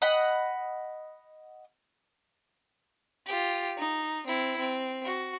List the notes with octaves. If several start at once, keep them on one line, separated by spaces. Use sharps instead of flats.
D#5 F#5 B5
F4 G4
D#4
C4 E4
C4
F#4